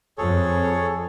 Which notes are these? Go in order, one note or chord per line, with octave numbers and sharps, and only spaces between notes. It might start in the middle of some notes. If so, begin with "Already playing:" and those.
F2 G#4 A4 C#5